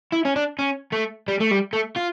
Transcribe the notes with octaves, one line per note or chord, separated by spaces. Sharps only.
E4
C#4
D4
C#4
A3
G3
A3
G3
A3
F4